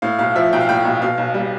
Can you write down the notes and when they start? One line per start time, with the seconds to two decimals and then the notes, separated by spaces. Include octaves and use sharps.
0.02 A2 F5
0.19 B1 F5
0.35 F3 E5
0.53 B1 G5
0.61 F5
0.69 A2 G5
0.85 B1
1.02 B2 F5
1.18 B1
1.34 G3